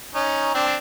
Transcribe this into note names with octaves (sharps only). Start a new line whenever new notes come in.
C#4 D#4
C4 D4